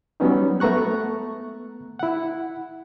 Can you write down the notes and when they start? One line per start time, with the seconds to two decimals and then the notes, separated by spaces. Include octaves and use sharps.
0.20 F#3 G3 B3 C#4 D#4
0.60 A3 B3 A#5 C#6 F#6
1.99 E4 F#5